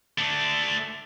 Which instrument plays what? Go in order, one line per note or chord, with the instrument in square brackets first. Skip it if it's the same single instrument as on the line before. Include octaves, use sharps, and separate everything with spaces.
[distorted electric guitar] A3 D4